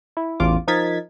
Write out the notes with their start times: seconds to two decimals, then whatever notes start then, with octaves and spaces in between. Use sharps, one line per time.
0.17 E4
0.40 A1 E2 F4 D6
0.67 F3 D#4 A#4 G#6 A6 B6